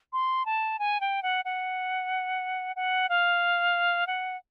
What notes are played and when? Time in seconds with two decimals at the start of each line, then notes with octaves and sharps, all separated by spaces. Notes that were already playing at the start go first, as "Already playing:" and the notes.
0.13 C6
0.46 A5
0.79 G#5
1.01 G5
1.23 F#5
1.45 F#5
2.76 F#5
3.09 F5
4.07 F#5